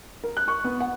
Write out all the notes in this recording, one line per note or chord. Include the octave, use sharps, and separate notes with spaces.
A#4
F#6
C#6
B3
F#5